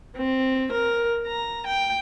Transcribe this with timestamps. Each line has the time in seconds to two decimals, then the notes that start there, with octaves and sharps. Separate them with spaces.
0.17 C4
0.72 A#4
1.27 A#5
1.67 G5